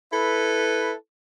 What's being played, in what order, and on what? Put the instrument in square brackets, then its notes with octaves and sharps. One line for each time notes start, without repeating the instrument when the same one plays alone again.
[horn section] E4 A4 B4